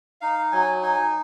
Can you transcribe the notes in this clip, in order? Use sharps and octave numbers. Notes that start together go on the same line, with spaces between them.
D#4 F5
F#3 G#5
D#4 G#5